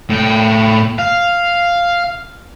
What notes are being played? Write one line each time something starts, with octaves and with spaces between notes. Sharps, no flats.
A2 G5
F5